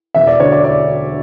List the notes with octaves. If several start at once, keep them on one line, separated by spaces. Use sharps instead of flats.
E1 E5
D5
D2 D3 C#5
D5
D5